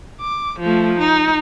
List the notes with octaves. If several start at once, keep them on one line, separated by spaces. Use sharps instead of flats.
D6
F3 A3
D#4